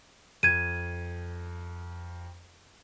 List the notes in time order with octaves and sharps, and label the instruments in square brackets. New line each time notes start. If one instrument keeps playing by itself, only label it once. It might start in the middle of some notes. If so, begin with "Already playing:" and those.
[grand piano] F2 [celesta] G#6 D#7